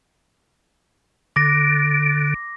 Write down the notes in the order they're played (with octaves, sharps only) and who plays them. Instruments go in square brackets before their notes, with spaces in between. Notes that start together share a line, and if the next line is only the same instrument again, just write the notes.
[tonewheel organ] D3 [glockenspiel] D6 A#6